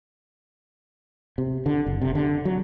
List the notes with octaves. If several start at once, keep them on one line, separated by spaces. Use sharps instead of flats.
C3
D3
F#1
C3
D3
F#3